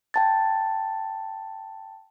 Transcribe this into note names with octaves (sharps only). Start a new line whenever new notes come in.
G5 A5 A6